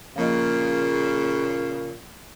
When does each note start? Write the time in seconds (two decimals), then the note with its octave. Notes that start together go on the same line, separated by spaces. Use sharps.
0.16 A#2 C#3 F3 A#3 D#5